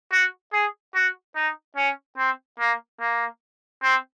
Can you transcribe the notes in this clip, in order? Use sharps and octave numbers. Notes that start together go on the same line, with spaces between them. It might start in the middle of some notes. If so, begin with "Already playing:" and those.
F#4
G#4
F#4
D#4
C#4
C4
A#3
A#3
C4